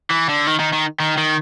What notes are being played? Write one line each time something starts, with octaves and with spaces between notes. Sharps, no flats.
E3
D3
D#3
D#3
D#3
D#3
D#3